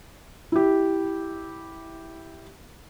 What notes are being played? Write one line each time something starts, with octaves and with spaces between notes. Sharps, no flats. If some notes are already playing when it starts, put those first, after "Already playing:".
E4 G4